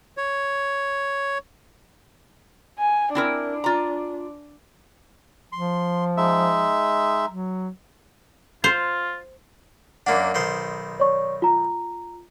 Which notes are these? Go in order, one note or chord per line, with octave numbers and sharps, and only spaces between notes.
C#5
G#5
C4 D4 E4 A#4
F4 A#5
F3 C6
G#3 D#4 E5
F#3
F4 C5
F#2 A#3 D4 F#5
B1 D#3 C5
C#5 D5 C#6
F4 A#5